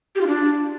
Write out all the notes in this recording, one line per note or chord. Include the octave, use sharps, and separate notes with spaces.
G4
F4
D4